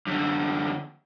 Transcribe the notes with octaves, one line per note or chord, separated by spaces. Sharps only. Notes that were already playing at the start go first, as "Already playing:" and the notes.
F#2 D3